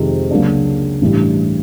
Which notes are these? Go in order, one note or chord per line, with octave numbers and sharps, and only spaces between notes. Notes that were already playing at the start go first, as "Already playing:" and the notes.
Already playing: F2 C3 D#3 G#3
C#2 C#3 F#3 A#3 D4
A1 G2 E3 G3